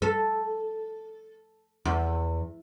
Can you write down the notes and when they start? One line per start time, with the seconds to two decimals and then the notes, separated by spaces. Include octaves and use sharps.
0.02 A4
1.85 E2